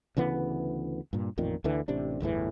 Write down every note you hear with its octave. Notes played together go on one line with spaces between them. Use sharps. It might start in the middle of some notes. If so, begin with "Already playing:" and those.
D2 C#3 E3 B3
G2 A#2
A1 F2 A#2 D#3
D2 D3 E3
A1 C3 D4
G1 E2 A2 E3